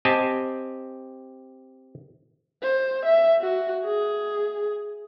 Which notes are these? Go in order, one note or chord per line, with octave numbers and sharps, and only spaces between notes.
C4 G4 D#5 G#5 A5
C5
E5
F#4
G#4